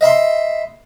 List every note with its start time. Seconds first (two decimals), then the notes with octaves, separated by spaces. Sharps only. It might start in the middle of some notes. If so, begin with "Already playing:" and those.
0.01 D#5 E5 B5 C6